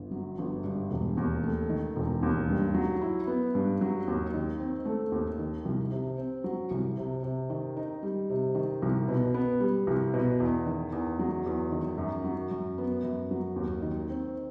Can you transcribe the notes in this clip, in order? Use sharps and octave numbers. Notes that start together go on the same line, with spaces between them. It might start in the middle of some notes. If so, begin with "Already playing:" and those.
Already playing: G1
F#3
G1
G2
E1
D#2
A3
D#3
E1
D#2
G2
F#3
E4
B3
G2
F#3
D#2
D#3
C4
A3
D#2
D#3
C2
C3
C4
F#3
C2
C3
C3
D#3
D#4
G3
C3
D#3
C2
B2
B3
G3
C2
B2
E2
D#3
E2
F#3
E2
D#3
F#2
F#3
F#2
B3
F#2
F#3
D#2
D#3
C4